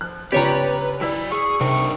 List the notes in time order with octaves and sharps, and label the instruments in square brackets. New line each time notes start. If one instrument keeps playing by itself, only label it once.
[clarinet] F3 [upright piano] F#6
[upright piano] G1 C#2 [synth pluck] G4 C#5 A#5 [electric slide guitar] B4 [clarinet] D5
[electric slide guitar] F#3 D5 [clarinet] E4 [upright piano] E6 B6
[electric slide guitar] G#4 [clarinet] C#6
[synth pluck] C3 [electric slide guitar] D4 D#4 A#4 [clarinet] C#6